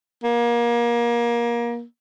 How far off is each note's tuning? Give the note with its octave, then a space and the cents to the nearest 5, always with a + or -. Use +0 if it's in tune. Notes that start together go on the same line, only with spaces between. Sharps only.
A#3 +25